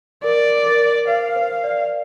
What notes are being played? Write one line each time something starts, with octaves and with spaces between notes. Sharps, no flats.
A#4 D5
A#4
C5 F5
C5
D5